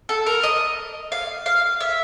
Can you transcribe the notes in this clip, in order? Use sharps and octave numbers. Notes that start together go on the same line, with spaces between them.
A4
A#4
D#5
F5
F5
E5